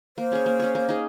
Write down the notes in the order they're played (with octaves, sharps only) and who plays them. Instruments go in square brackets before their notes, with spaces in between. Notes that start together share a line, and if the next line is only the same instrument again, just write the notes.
[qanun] A#3 [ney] C5
[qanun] C#4 G#4 C#5
A#3
C#4 G#4 C#5
A#3
D#4 G#4